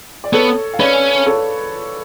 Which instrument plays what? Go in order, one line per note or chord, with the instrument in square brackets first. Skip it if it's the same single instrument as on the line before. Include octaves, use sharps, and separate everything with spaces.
[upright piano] D5
[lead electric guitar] B3 [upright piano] A4 C#5
[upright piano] F5
[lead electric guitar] C#4 [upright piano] B4 D5
[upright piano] A4 C#5